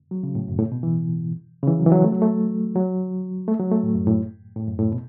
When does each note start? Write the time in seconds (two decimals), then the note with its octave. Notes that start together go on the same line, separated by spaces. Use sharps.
0.11 F#3
0.23 C#3
0.35 A2
0.48 F#2
0.59 A2
0.72 B2
0.83 E3
1.63 C#3
1.67 E3
1.80 F#3
1.86 E3
1.92 F#3
2.04 A3
2.12 F#3
2.22 A3
2.75 F#3
3.48 A3
3.59 F#3
3.72 A3
3.83 A2
3.95 F#2
4.07 A2
4.56 A2
4.68 F#2
4.79 A2
4.92 B2